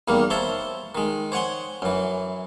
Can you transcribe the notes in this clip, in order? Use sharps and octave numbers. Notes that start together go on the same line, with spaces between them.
E2 D#3 G3 A#3
C5 C#5 E5 A5 C6
D#3 G#3
C5 C#5 F#5 G#5 C6
F#2 E3